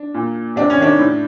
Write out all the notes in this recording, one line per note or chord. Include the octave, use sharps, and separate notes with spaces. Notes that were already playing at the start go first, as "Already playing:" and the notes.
Already playing: D4
A#2
C3 D4
C#4
D#3 D4
A2